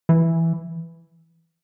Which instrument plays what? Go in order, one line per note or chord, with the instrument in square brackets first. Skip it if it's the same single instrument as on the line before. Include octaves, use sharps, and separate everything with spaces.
[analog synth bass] E3